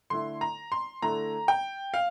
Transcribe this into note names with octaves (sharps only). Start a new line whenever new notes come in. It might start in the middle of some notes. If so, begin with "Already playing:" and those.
D3 A3 E4 C6
A#5
C6
D3 A3 E4 A#5
G5
F5